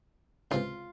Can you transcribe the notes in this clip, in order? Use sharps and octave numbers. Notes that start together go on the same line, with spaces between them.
C#2 C3 E3 G#3 F4